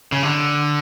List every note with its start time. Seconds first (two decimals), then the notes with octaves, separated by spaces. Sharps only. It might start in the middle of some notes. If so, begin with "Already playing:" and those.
0.12 C#3
0.23 D3